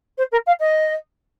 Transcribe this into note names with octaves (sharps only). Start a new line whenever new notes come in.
C5
A#4
F5
D#5